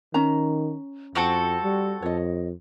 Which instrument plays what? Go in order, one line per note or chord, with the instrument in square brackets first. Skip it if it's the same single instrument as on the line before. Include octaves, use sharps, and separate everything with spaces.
[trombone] D#3 [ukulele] C#4 A#5
[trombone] F2 [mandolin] C4 F#4 A4
[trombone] G3
[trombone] F2 [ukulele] C#5 D#5